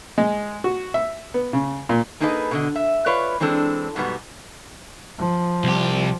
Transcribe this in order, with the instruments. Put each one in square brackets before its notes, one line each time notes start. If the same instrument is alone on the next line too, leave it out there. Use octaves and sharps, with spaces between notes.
[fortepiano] G#3
F#4
E5
B3
C#3
A#2
[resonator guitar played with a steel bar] A#3 D#4 G#4 A4 B4 D#5
B2 D3 D#5
E5
F4 B4 C#5 D5
E3 G#3 C4 D4 A4
G#2 B2 F#3 G3 B3 F#4
[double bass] F3
[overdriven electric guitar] C2 G4